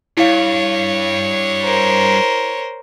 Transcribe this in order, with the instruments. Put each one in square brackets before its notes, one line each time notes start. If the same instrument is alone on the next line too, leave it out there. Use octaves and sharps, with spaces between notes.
[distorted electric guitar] G2 [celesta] E4 F5 [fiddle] C#5
[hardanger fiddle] A#4 C5